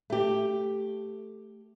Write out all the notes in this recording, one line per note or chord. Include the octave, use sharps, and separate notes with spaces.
A3 G4